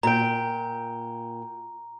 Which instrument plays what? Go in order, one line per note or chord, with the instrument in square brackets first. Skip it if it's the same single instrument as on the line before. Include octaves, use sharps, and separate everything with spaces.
[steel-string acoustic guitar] A#2 G5 [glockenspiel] A#5